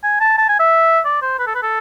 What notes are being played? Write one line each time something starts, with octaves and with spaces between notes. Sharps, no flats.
G#5
A5
A5
G#5
E5
D5
C5
B4
A4
B4
A4